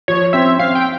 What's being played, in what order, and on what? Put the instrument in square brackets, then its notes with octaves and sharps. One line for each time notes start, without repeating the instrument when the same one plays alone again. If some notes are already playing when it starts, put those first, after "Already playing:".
[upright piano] F3 [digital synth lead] C#5
[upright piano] C4 [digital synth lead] E5
[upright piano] C4 [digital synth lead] F5
[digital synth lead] G5